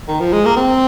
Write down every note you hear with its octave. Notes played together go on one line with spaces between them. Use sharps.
D#3
F3
G#3
A#3
C4